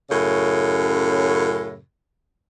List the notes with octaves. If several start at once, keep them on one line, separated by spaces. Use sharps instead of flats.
F#2 A2 C#3